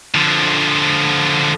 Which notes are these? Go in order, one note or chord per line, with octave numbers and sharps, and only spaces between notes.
D3 F3